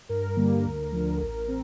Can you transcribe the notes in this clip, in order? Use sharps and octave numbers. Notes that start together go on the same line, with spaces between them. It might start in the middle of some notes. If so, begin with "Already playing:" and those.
G2 A#4
D3 G3 A#3
D2
D3 F3
A1
C4